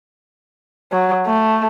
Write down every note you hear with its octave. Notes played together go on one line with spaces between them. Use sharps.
F#3
A3